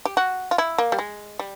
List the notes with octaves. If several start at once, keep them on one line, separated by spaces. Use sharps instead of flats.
G4
F#4
F4
E4
A#3
G3
G#3
G3